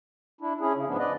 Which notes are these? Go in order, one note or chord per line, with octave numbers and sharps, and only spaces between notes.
D4 E4
C#4 E4 G#4
C#3
G#2 F3 B3 D4
B4 D5 D#5